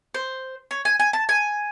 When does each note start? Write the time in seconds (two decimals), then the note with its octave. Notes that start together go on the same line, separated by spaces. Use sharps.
0.14 C5
0.71 C#5
0.85 G#5
1.00 G#5
1.13 A5
1.29 G#5